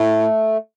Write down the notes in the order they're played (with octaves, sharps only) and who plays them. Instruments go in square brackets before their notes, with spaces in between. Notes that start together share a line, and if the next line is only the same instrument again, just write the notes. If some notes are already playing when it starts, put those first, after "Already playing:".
Already playing: [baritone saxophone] A2 [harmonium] A3